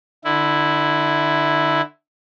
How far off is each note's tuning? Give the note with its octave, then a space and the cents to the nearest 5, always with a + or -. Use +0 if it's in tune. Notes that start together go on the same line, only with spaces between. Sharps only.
D3 +30 E4 +0